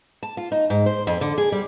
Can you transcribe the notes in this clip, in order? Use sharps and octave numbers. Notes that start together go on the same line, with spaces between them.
A5
F4
D#4
G#2
C5
F2
D3
G#4
G3